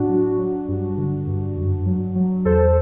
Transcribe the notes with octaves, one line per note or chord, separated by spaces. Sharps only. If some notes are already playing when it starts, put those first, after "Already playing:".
Already playing: A2 D4 F#4
F#3
F#3
G2
D3
G2
F#2
F#3
F#3
E2 A4 C5